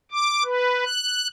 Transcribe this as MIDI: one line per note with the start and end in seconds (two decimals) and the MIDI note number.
0.11 0.43 86
0.43 0.84 71
0.84 1.28 90